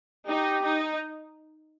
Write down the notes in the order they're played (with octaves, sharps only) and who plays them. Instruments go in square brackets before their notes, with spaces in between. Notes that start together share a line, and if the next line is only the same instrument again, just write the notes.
[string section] D#4 [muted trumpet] G4
[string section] D#4